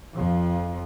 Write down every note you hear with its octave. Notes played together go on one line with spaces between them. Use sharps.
F2 F3